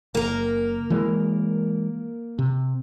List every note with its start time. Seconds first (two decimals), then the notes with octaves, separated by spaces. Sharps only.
0.15 F#1 A#3 A#4
0.90 E3 G#3
2.39 C3